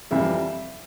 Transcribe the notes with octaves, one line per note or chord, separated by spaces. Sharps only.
F2 C3 E3 G3 E5